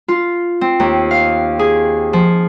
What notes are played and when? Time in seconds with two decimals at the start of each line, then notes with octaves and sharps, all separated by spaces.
0.08 F4
0.61 C4
0.80 D#2
1.11 F5
1.59 G#4
2.13 F3